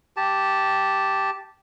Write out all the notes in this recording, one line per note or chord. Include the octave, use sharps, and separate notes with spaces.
G4 A5